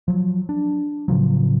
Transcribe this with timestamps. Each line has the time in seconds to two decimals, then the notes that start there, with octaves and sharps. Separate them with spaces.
0.08 F3 F#3
0.49 D4
1.08 A2 C#3 F3 F#3